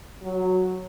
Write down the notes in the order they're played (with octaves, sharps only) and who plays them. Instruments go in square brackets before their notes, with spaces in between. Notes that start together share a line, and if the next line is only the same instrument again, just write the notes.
[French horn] F#3